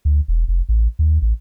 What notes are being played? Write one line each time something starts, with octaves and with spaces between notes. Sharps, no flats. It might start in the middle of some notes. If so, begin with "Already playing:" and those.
D2
E1
F1
A1
D#2
A1